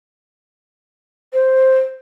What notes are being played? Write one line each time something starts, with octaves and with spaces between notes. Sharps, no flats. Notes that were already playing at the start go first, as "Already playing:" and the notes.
C5